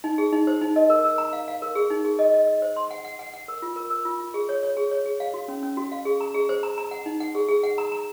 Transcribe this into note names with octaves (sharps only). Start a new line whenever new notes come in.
D#4
G#4
D#4
C5
D#4
D#5
A#4
A#4
A#5
F5
F5
A#4
G#4
D#4
G#4
D#5
D#5
D#5
C5
C6
F#5
F#5
F#5
F#5
A#4
F4
A#4
A#4
F4
F4
G#4
C#5
C#5
G#4
C#5
G#4
F5
F#4
C#4
C#4
F#4
F5
G#4
A#5
G#4
C5
A#5
A#5
F#5
D#4
F#5
G#4
G#4
F#5
A#5
A#5